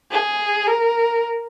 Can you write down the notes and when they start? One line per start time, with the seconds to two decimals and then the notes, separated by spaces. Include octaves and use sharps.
0.11 G#4
0.67 A#4